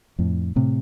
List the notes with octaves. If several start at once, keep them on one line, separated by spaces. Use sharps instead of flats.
F2 A2
A2 C3